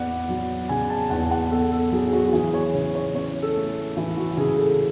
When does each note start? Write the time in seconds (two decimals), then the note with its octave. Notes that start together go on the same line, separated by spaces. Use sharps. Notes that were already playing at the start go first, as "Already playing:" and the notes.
Already playing: E2 B3 D5 F#5
0.29 F#3
0.69 C#3 G#5
0.90 A5
1.10 E2 F#5
1.31 F#5
1.51 B3 A4
1.72 A4
1.92 F#3 G#4
2.07 G#4
2.13 F#4
2.29 F#4
2.33 E3 G#4
2.54 C#5
2.74 C#3
2.95 C#5
3.15 C#4 C#5
3.42 A4
3.56 A3
3.97 E3
4.17 F#4
4.37 C#3 G#4
4.58 A4